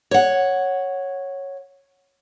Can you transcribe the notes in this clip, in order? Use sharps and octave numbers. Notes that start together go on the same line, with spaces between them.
C#5 F#5